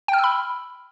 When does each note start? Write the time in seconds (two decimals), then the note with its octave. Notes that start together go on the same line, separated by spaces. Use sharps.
0.08 G5
0.13 F6
0.18 E6
0.24 B5